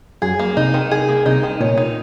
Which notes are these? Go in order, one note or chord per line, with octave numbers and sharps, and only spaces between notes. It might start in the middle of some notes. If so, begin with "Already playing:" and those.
F#2 F#3 G#4
A#3
C2 C3 D#4
D#3
G#4
A#3
C2 C3 D#4
D#3
A#2 C#5
D#4